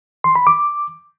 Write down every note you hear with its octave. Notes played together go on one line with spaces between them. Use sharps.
C6
B5
D6